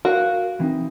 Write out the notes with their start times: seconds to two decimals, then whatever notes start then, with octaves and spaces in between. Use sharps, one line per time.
0.05 F#4 A#4 F5
0.60 E3 C4 D#4